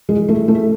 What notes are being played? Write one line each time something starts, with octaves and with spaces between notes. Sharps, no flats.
G#3
A3
A3